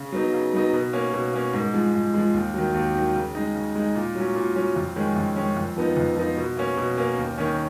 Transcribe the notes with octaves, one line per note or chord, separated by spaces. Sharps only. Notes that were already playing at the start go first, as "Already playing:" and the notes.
Already playing: C#3
F#3 B3 D#4
C#3
F#3 B3 D#4
B2
A#3 C#4
B2
A#3 C#4
G#2
F3 G#3
G#2
F3 G#3
D#2
D#3 F#3
D#2
D#3 F#3
C#3
G#3 D#4
C#3
G#3 D#4
A#2
F#3 C#4
A#2
F#3 C#4
F2
D#3 G#3 C#4
F2
D#3 G#3 C#4
F2
F3 B3 D#4
F2
F3 B3 D#4
B2
A#3 C#4
B2
A#3 C#4
D#2
D#3 A#3 C#4